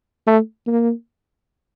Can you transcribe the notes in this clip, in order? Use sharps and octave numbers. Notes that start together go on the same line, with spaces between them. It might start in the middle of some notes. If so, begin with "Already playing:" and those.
A3
A#3